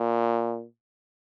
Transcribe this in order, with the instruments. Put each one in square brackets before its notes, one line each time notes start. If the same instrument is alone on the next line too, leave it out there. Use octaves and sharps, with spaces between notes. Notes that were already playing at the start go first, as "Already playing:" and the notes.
Already playing: [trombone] A#2